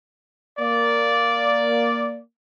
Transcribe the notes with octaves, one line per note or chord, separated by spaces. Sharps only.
A#3 D5